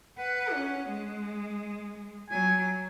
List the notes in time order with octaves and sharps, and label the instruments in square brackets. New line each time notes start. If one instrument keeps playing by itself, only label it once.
[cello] B4 [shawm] F#5
[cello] C#4
G#3
[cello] F#3 [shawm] G#5